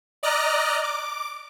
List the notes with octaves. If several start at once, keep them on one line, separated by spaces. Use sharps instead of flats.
D5 D#5 A#5 F6 F#6
D6